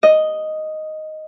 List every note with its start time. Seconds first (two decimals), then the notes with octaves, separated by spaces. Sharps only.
0.03 D#5